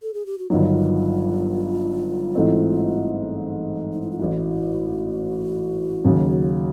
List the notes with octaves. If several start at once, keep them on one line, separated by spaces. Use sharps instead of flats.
A4
G#4
G4
F#4
G1 G2 D#3 F#3 F4
A1 G#2 E3 A3 C4
D#4
E4
F4
A1 A2 E3 F#4
D#2 C#3 F#3